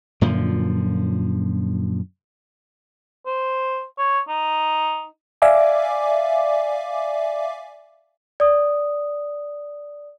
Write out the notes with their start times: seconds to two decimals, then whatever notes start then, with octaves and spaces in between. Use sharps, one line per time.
0.21 F#2 A#2 D3 F3
3.26 C5
3.99 C#5
4.29 D#4
5.42 D5 E5 F5 G#5 D6
8.40 D5 D#6